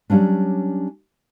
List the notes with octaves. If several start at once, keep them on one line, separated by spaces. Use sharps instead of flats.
F#3 G3 A#3 C#4 D4